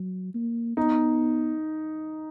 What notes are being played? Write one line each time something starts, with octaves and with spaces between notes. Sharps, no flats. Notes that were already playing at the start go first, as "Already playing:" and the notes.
Already playing: F#3
A#3
B3 D#4